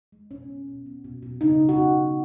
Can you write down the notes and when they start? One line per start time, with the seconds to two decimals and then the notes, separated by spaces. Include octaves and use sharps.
0.12 G#3
0.31 B2 C#4
0.49 B3
0.68 B2
0.86 B3
1.04 B2
1.23 B2
1.41 C#3 D#4
1.59 C#3
1.69 F#4
1.78 B3
1.97 C#3